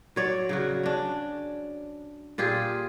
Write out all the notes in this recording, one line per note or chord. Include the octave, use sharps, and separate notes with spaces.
F#3 C#5 D5
C#3 F#3 F#4
C#4 D4
A#2 F4 G4 G#4